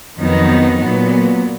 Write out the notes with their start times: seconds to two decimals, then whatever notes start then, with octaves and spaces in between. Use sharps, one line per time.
0.18 F2 D#3 F#3 B3 D#4
0.80 A#2 F#3 B3